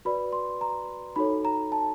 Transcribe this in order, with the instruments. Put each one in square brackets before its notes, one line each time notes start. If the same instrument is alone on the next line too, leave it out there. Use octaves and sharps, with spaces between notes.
[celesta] F#4 B4 D5 B5
C6
A#5
D#4 F#4 A4 C#5 B5
A#5
A5